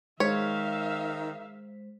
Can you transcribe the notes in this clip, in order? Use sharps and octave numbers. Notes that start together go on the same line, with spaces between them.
D#3 G#3 C5 C#5 E5 F5 B6